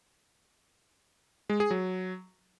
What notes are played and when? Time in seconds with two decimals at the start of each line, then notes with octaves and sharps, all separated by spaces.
1.50 G#3
1.60 G#4
1.71 F#3